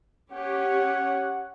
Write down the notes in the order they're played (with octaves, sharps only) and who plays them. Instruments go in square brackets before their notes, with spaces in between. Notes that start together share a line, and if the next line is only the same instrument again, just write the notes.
[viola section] C#4 G4 C#5 [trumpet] F#5